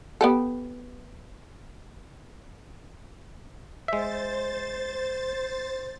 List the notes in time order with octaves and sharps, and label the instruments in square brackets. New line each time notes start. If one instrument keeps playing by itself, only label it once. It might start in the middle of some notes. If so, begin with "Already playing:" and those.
[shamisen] B3 G4 A4
[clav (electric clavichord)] G#3 E5 [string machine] C5 A6